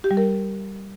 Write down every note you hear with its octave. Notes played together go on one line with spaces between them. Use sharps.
G4
G3
A#4